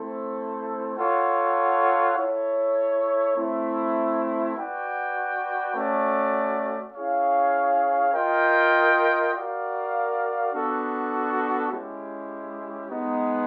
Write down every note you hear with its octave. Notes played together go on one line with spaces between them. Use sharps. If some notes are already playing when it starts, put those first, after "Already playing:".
Already playing: A3 C4 E4 A4 C5
F4 A4 C#5 F#5
E4 A4 C#5
A3 C4 E4
F#4 B4 D5 G5
A3 C#4 F#4 A4 D5
C#4 E4 G#4 C#5 F5
F4 A#4 D#5 G5
F#4 A#4 D5 F5
B3 D4 F#4 A4
G#3 C#4 E4 G4
G#3 B3 D#4